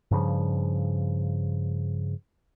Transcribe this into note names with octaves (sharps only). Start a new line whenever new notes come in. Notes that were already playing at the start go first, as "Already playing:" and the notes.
G2 C#3 F3